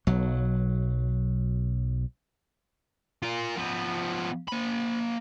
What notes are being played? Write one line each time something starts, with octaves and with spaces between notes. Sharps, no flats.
B1 F#3
F4 A#4
F3 B3
A#3 B5